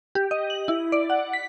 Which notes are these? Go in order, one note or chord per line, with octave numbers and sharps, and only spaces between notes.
G4
D#5
F#7
E4
D5
F#5
B6